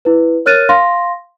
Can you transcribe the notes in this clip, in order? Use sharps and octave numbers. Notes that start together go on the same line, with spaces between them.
E4 B4
A#4 C#5 F6 F#6 A6 D#7
F5 C6 A#6